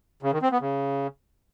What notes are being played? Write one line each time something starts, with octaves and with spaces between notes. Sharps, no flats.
C#3
D#3
C4
B3
C#3